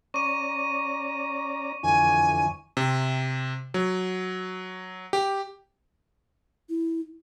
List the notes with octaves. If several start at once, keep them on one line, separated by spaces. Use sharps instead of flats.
C#4 D5 A#5 C#6 D6 D#7
F2 D3 E3 G#5
C3
F#3
G4
E4